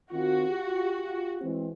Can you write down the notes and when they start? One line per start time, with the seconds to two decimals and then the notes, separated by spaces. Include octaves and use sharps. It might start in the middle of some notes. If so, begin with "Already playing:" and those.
0.12 D#3 C4 F4 F#4
0.49 F4 G4
1.41 E3 G#3 C4